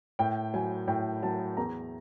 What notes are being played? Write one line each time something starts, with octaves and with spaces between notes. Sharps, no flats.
A2 G5
F#3 G#5
A2 G5
F#3 A5
E2 A#5